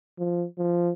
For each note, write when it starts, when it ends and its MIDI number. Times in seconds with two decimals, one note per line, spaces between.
0.19 0.46 53
0.58 0.92 53